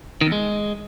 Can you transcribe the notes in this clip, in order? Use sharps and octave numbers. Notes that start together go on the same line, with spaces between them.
D#3
E2
G#3